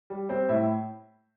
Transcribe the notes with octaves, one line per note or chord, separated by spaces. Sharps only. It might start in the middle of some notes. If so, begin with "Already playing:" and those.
G3
G3 C4 C5
A2 E4 E5